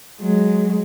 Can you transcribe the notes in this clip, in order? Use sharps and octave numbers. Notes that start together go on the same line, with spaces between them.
F#3 G#3